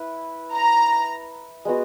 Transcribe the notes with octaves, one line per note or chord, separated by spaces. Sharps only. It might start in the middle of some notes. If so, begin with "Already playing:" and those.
Already playing: E4 B4
A#5
G#3 B3 F#4